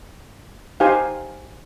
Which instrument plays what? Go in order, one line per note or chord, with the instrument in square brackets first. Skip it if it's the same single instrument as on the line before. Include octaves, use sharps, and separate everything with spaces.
[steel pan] D#4 G4 C5 F5 G#5